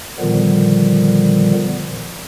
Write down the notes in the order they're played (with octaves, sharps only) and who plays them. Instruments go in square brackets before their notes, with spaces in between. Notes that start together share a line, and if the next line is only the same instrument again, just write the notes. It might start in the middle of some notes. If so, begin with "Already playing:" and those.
[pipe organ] A#2 D3 D#3 F3 G3 B3